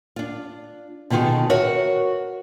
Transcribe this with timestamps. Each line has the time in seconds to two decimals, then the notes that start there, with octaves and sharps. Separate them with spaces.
0.16 D4 F4
1.10 B2 D3 D#3 F4 F#4 G#4
1.50 F#4 A#4 B4 C#5 E5 F#5